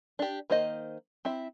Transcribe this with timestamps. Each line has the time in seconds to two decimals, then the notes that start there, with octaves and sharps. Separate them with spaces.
0.19 D4 G4
0.50 D#3 A#3 C5 D#5
1.25 C4 E4 E5